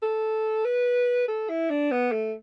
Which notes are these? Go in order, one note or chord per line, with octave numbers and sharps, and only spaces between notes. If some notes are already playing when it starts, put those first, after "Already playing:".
A4
B4
A4
E4
D4
B3
A3